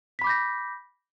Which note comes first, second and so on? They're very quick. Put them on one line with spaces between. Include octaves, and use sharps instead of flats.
B6 B5 D6 G6 A#6